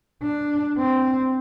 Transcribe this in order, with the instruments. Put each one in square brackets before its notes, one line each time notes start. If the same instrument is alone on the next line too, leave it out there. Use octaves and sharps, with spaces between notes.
[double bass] D4
C4